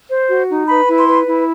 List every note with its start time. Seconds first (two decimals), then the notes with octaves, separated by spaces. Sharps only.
0.10 C5
0.30 F#4
0.49 D#4
0.68 B4 B5
0.88 E4
0.97 C6
1.08 B4
1.27 E4